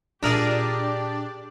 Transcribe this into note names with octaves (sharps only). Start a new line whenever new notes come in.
A#2 G#3 D4 G4 G#4 A#4 D5 E5